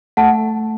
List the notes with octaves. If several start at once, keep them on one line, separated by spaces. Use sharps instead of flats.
A3 F#5 A5